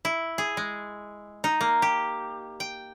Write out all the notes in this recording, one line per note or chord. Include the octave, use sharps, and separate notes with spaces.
E4
G#4
G#3
D#4
A#3
G4
G5